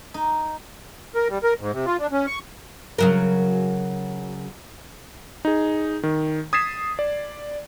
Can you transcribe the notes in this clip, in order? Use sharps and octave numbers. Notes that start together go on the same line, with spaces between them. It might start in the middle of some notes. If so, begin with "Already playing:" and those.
D#4
A#4
G3
A#4
G#2
C3
F4
D4
C#4
C#6
C#3 F#3 A#4
D#4 G#4
D#3
D#6 G#6 A6 B6 C7 E7
D5